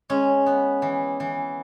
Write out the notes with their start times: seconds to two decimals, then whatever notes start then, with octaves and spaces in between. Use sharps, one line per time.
0.10 G#3 C#4
0.46 B3
0.82 E3
1.20 E3